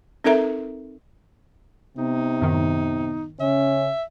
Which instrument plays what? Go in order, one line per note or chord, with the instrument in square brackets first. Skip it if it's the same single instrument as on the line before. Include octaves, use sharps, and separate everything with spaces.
[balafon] C4 D#4 A4 A#4 E5 A#5
[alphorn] C3 [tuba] B3 [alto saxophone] D#4
[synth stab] F#2 A2 D#3
[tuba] C#3 [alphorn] C#4 [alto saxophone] E5